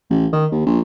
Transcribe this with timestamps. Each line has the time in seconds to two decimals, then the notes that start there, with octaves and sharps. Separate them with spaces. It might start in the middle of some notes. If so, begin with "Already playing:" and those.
0.10 A1
0.33 D#3
0.52 D#2
0.66 A#1